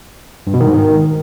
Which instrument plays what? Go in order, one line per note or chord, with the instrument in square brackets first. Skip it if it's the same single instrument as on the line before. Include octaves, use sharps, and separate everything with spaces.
[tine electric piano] G2
B2
D#3
G#2
D#3